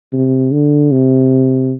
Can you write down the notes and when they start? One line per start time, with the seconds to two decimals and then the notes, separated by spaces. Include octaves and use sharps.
0.13 C3
0.52 D3
0.92 C3